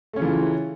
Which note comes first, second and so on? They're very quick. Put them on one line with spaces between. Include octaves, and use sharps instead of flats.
A3 C#4 C#3 E3 F4